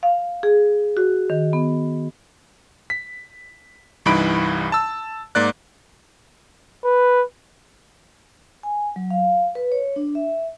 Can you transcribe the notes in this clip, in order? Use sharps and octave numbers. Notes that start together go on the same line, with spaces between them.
F5
G#4
F#4
D#3
B3
B6
C2 G2 E3 D#4 B5 D7
A5 E6
G#2 A#3 D5 F#6
B4
G#5
F#3
F5
B4
C#5
D4
E5